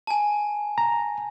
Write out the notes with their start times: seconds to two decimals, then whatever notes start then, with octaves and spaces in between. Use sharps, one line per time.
0.07 G#5 A5
0.78 A#5